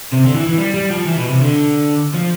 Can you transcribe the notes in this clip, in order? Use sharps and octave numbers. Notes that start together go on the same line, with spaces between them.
C3
D3
E3
E3
G3
G3
F3
E3
B2
C3
D3
F3